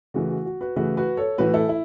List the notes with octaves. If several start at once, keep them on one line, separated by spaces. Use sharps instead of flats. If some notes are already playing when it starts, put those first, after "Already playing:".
C#3 E3 A3 F#4
F#4
F#4
F#4 B4
C#3 E3 A3 F#4 B4
F#4 B4
A4 C#5
A2 E3 A3 F#4 B4
E4 A4
E4